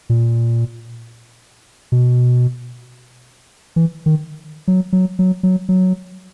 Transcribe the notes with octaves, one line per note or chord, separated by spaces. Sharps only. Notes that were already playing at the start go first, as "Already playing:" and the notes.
A#2
B2
E3
D#3
F#3
F#3
F#3
F#3
F#3